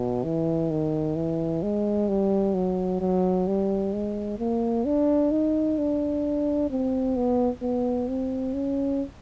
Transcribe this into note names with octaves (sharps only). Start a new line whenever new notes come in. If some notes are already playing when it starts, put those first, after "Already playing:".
Already playing: B2
E3
D#3
E3
G#3
G3
F#3
F#3
G3
G#3
A#3
D4
D#4
D4
C4
B3
B3
C4
C#4